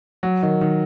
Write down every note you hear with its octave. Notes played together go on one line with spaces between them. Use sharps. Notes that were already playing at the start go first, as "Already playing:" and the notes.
F#3
D#3
D#3